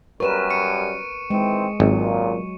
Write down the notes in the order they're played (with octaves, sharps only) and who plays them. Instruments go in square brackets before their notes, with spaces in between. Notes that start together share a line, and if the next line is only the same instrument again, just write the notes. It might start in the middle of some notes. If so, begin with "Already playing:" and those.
[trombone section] F#2 G3 [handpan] A#4 B4 [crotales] C#6 D#7 E7
[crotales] C#6 C#7 D#7
[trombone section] D#3 E3 C4 [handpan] G#3
[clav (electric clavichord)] G#1 [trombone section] C#2 A#2 [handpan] F#3